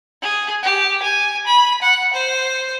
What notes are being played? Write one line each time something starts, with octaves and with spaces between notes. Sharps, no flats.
G#4
G4
G#5
B5
F#5
C5